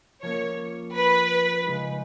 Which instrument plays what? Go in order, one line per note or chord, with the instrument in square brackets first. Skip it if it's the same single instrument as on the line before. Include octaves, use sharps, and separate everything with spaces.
[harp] F3 A#3 C#4 [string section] C#5
[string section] B4
[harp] C#3 G#3 D#4